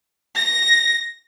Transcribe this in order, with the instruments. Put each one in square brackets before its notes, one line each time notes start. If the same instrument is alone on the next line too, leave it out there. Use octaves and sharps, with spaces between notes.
[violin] A#6